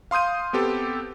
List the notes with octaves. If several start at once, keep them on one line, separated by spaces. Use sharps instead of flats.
F5 C6 D#6 G6 D#7
B3 C4 G4 A4